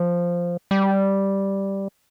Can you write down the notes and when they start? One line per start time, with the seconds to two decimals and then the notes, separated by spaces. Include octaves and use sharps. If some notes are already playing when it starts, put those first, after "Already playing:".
Already playing: F3
0.71 G3